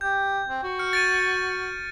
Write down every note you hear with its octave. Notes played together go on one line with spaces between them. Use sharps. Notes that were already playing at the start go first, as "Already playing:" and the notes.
G4 G6
C4
F#4
F6 C#7
A6 D7 D#7